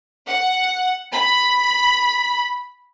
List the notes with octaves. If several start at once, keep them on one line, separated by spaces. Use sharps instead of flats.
F#5
B5